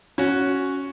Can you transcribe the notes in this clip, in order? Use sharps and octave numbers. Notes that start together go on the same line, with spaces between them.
C#4 F#4